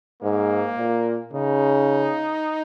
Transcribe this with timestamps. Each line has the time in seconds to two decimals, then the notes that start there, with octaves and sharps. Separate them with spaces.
0.22 G#2 A#3
0.77 A#2
1.33 C#3 D#4